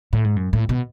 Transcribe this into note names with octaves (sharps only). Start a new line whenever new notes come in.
A2
G#2
F#2
A2
B2